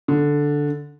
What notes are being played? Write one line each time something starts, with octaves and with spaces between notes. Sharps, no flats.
D3